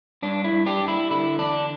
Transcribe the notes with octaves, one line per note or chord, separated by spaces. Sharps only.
G2 D4
E4
G2
D4 G4
G3
E4
D3 E4
E2 D4